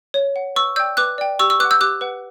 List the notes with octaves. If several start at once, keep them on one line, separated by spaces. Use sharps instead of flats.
C#5
F#5
B4 C#6 E6
D5 G5 E6 G6
B4 D6 F#6
D5 G5
G4 C#6 E6
C#6 E6
B4 D6 F#6
F#5
E6 G6
G4 D6 F#6
B4 F#5